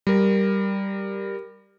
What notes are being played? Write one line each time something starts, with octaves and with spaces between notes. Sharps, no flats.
G3 A#4